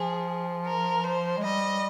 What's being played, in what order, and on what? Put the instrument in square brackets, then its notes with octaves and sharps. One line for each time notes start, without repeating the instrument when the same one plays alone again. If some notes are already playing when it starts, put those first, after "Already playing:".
Already playing: [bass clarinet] F3 [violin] G#4
[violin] A#4
C5
[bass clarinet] G#3
[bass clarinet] G3 [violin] D#5